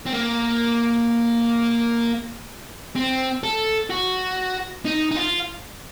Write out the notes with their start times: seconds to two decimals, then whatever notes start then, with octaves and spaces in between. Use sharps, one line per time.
0.06 C4
0.13 A#3
2.96 C4
3.43 A4
3.90 F#4
4.85 D#4
5.11 D#4
5.16 F4